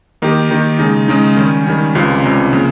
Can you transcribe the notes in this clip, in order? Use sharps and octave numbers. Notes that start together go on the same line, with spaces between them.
D#3 A#3 D#4 G4
D#3 A#3 D#4 G4
C#3 G#3 D#4
C#3 G#3 D#4
D#3 G3 C#4
D#3 G3 C#4
C#2 C3 G3 C#4 F4
C#2 C3 G3 C#4 F4
C#3 F3 A#3